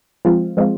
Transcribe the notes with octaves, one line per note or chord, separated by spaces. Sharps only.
F3 G#3 C4 F4
F3 G#3 C4 F4